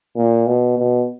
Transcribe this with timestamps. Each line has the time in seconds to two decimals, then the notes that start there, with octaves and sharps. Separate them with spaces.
0.16 A#2
0.47 B2
0.78 B2